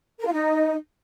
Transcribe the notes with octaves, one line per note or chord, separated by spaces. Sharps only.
A#4
F4
D#4